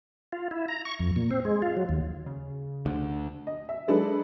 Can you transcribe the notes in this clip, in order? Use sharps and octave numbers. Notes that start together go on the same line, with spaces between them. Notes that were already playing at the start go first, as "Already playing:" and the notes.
F4
E4
A#5
C#6
F2
A#2
C4
G#3
F4
F#3
D#2
C#3
D2
D#5
E5
F#3 G#3 D4 D#4 A4 B4